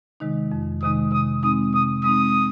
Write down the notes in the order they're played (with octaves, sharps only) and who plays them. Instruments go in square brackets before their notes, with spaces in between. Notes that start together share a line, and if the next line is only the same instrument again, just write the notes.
[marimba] C3 D#3 G#3 D#4
F2
[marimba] C3 D#3 G#3 D#4 [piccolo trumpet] D#6
[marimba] C3 [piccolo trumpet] D#6
[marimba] G#3 C4 D#4 [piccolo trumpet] D#6
[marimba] C3 [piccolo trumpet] D#6
[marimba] G#3 C4 D#4 [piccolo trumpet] D#6